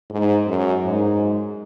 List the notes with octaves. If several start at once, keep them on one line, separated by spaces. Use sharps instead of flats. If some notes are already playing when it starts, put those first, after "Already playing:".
G#2
F#2
G#2